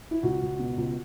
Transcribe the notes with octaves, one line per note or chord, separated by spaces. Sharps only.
E4
C#2 F#4
C#2
B2
C#2